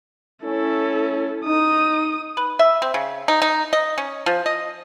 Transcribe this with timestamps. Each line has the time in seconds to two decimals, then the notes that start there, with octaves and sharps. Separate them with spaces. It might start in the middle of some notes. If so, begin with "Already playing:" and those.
0.44 A3 C#4 E4 A4
1.45 D#4 D#6
2.37 B4
2.59 E5
2.82 C4
2.94 C#3
3.28 D#4
3.42 D#4
3.73 D#5
3.98 C#4
4.26 F3
4.46 D#5